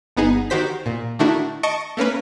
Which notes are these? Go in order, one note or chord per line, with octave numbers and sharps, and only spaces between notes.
G1 B3 D#4 G#4
D#3 F#4 G4 C5 B6
A#2
D#3 A3 D4 E4 F#4
D#5 A5 C#6 C#7 D7
A3 A#3 C#4 B4